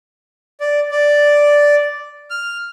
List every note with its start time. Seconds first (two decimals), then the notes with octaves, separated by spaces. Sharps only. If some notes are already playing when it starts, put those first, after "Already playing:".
0.60 D5
0.91 D5
2.30 F6